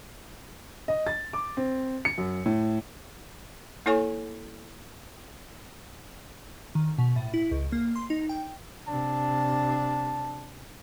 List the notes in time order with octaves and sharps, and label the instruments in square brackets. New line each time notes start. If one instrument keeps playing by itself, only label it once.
[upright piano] D#5
A6
D6
C4
C#7
F#2
A2
[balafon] A#3 E4 A4 C#5 G#5 C#6
[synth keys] D#3
B2
A2
E4
C#2
A#3
C6
D#4
G5
[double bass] C3 D4 [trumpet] A5